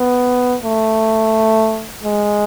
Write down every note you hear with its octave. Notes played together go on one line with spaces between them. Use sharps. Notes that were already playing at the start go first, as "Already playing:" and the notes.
Already playing: B3
A3
G#3